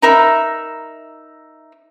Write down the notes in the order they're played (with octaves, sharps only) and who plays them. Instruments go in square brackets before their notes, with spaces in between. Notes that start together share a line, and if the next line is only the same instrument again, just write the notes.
[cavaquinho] D#4 A#4 E5 B5